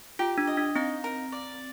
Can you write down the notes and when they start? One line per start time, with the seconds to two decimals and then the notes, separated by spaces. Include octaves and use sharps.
0.19 F4 G4
0.38 D4
0.47 D#5
0.57 D4
0.76 C4 D#4
1.04 A#4
1.32 D5